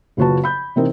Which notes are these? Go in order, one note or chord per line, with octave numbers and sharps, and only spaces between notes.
F#1 C#3 F4 F#4 B4 A5
B5 G6
C3 E3 C4 D#4 A#4